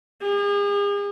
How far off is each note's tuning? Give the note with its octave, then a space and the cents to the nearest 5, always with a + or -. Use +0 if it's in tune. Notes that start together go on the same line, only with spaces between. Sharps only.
G#4 -45